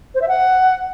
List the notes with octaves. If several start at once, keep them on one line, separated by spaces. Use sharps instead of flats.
C5
E5
F#5